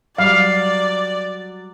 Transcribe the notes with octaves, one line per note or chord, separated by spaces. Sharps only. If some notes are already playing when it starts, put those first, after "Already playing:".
F#3 G3 D5 F5